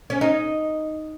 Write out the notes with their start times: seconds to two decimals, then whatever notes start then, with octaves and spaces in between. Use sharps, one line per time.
0.10 C#4
0.21 D#4